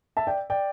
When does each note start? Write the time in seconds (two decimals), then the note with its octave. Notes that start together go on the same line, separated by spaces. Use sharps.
0.17 E5 A5
0.27 D5 G5
0.50 D5 G5